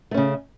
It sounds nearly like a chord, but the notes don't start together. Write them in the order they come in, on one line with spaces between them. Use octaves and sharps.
A3 C#4 C#3